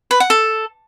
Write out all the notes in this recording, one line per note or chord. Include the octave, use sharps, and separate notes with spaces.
B4
F#5
A4